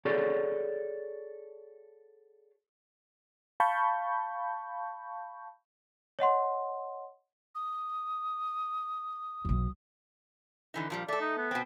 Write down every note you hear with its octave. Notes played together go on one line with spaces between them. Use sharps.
F#4 G#4 A4 C#5 D5
F5 A5 B5 C#6 G6
C#5 D#5 F#5 C6
D#6
B1 F2
D3 E3 D#4
A#2 F3 G3
A3 A4 D5
D#4
B3
B2 C4